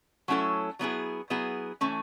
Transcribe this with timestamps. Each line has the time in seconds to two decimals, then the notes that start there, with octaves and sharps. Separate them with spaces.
0.28 F#3 A3 C#4 E4 A4
0.79 F#3 B3 E4 G#4
1.30 F#3 B3 E4 G#4
1.81 E3 A3 C#4